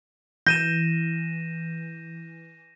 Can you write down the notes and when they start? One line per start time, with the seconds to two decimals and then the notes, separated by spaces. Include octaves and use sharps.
0.47 E3 G6 A#6 D#7 E7